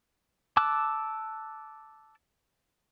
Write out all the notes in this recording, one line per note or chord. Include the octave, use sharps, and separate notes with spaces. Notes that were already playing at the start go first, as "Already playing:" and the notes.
A5 D6 E6 F#6